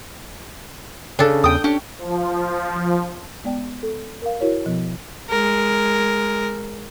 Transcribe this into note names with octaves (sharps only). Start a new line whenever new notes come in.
C#3 D4 A4
E2 G5 D#6
C#4 D4 G4
F3
G#3 B3 D5 G5
A4
A#4 F5
E4 F#4 A#4 C#5
B2 F3 B3
G#3 A#4